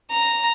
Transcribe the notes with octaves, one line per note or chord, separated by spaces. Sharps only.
A#5